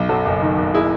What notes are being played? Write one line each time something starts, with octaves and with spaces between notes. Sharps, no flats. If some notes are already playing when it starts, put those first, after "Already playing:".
Already playing: B1
F#2 F#4 A4
F#1
D#3
F#1
E4 G#4